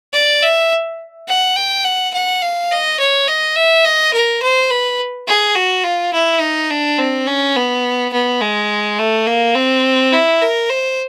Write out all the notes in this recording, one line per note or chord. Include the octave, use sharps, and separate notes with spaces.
D5
E5
F#5
G5
F#5
F#5
F5
D#5
C#5
D#5
E5
D#5
A#4
C5
B4
G#4
F#4
F4
E4
D#4
D4
C4
C#4
B3
B3
G#3
A3
A#3
C4
E4
A#4
C5